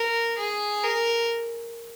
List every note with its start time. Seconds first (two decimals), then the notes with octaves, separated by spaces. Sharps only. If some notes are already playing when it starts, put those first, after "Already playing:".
Already playing: A#4
0.37 G#4
0.84 A#4